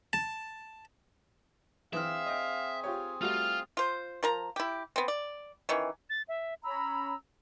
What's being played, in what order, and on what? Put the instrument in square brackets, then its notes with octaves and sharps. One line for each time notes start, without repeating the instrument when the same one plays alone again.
[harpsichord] A5
[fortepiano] E3 F6 [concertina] C4 G#4 [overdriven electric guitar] E5 [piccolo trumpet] F5
[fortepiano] D#5 G5
F4 G4 C#5
[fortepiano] G3 A3 F#4 [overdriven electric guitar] F4 F5 [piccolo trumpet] F6
[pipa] F4 C5
F3 A#4 A#5
E4 G4
B3 C4
D5
D#3 E3 C#4
[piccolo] A6
E5
[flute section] C#4 A#5 B5 [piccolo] E6